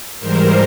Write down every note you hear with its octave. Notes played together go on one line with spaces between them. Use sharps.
G#2 E3 G3 A#4 C5